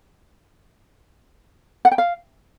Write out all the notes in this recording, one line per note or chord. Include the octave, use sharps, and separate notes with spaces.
F#5
G5
F5